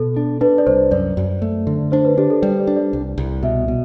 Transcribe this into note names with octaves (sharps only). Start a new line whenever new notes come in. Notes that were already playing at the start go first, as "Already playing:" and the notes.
Already playing: B2 A4
D4
D4 B4
D5
C2 C5
F#2 D5
F#2
A3
D3
D4 C5
B4
D4 G4
A4
G3 D5
D5
D4
D5
C2
C2
B2 E5
B2